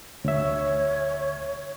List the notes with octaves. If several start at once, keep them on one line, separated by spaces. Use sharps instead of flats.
D2 C#5 E5